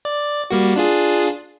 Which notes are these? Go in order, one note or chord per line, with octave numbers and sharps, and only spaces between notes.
D5
G3 A#3 F#4
D4 F4 G#4